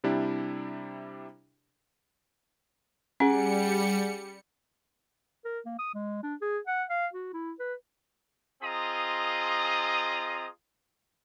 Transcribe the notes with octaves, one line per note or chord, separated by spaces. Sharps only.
C3 G3 D4 E4 G4
G3 C#4 G#4 F#5 G#5 C#7
A#4
A#3
D#6
G#3
D4
G#4
F#5
F5
F#4
E4
B4
C4 F4 G#4 D#5 A#5 D#6